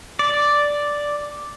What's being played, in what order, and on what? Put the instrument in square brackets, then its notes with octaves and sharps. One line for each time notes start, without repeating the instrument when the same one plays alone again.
[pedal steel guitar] D5